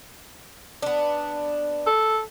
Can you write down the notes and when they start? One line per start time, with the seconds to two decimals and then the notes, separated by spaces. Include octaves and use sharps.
0.82 B3 D4
1.86 A4